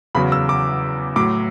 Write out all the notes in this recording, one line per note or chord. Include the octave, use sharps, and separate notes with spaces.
E2 C#3 F#3 B5
E6
D6
A2 F#3 D6